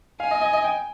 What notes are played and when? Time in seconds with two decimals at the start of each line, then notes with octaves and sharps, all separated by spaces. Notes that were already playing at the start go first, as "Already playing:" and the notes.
0.20 F5 G#5
0.31 D#5
0.41 D#5
0.53 D#5
0.64 G5